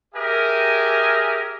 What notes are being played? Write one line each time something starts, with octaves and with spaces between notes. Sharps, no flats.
G4 G#4 A#4 D#5 E5 G#5